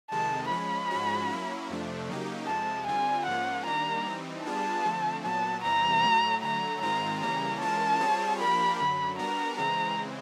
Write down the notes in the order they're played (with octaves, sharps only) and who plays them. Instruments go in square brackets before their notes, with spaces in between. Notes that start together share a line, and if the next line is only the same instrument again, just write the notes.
[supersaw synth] F2 C3 D#3 G#3 [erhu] A5
[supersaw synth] F3 G#3 C#4 [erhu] B5
[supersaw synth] G#2 F3 G#3 C#4 F#4
F#3 A#3 C#4 E4
F2 C3 F3 A3 D4
C#3 F#3 A#3 D#4 G4
[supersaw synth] F2 C3 F3 G#3 [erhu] A5
[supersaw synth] D3 G3 C4 F4 [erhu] G#5
[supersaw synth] G#2 F3 A#3 C#4 F4 [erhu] F#5
[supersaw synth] D#3 G3 A#3 D4 [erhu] A#5
[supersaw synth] E3 G3 C4 D#4
[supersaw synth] G3 B3 D4 F4 G#4 [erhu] A5
[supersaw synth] D3 F3 A3 C4
[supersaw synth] A#2 F#3 B3 [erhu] A5
[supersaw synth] E2 C3 E3 G3 C4 [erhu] A#5
[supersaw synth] A2 F#3 A3
[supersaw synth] D3 F#3 A3 [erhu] A#5
[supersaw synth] G#2 D#3 G#3 C4 F4 [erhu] A#5
[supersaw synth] C#3 E3 G3 A#3 C#4 [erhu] A#5
[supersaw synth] E3 G#3 C#4 F4 A#4 [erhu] A5
[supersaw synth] G3 C4 F4 G#4 C#5
[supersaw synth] F3 A#3 D4 G4 A#4 [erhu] B5
[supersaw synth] F#2 D3 F#3 [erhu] B5
[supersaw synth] G3 B3 D4 F#4 A#4 [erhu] A#5
[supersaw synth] C#3 E3 G#3 C4 [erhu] A#5